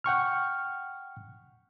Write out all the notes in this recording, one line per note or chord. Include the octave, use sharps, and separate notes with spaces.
F#5 G5 C#6 F6